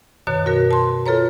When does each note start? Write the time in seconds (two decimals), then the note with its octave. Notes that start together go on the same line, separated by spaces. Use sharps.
0.27 F#2 B2 D#3 C#5 F#6
0.46 F#4 A#4
0.71 A5 C6
1.06 F4 A4 B4 C#5 A#5